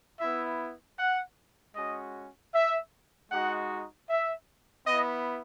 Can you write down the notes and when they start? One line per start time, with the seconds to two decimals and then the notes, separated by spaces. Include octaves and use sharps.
0.20 B3 E4 E5
0.98 F#5
1.75 G#3 C#4 F#4 D#5
2.54 E5
3.31 G#3 D#4 F#4 F#5
4.09 E5
4.87 B3 E4 D#5